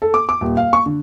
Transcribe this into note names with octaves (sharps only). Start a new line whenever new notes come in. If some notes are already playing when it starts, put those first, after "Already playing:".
A4
D6
D6
D#1
F5
C#6
D3